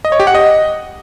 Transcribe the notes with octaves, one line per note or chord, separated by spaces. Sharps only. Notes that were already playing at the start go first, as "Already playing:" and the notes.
D#5
C#5
G4
F#5
D#5